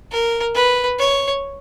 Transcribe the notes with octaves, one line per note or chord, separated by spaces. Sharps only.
A#4
B4
C#5